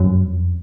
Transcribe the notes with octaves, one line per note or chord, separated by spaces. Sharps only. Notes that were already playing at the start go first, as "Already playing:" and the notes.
Already playing: F#2
F2